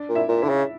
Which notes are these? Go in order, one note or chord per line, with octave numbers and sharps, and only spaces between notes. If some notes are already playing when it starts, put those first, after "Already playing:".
Already playing: D4 D5
A#2
E4 E5
A#2
D3 E4 E5
C#3